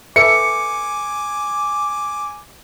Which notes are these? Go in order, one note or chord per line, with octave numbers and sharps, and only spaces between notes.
A4 B4 E5 G#5 D6 C#7